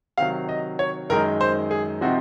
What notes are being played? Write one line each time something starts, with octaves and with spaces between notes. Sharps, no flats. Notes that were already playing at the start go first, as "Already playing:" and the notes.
C3 D#3 F#3 F5
D#5
C#5
F#2 D#3 G#3 D#4 A#4
C5
G#4
C3 F3 C4 D#4 F#4